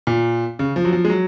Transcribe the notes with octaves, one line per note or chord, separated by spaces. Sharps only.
A#2
C#3
F3
F#3
F3
G#3
F#3